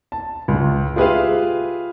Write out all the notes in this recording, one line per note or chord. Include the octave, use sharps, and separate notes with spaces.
A5
C#2
F4 G4 G#4 B4 E5 F5